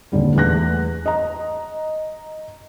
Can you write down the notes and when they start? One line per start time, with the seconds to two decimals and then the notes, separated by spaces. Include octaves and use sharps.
0.12 D#1 D3 G3
0.36 E2 A3 F#6 A#6
1.06 D#5 A#5